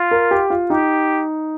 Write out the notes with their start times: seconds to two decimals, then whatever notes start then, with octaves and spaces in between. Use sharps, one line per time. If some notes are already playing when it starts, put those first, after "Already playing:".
Already playing: F4
0.11 A#4
0.31 G4
0.50 F4
0.70 D#4 G4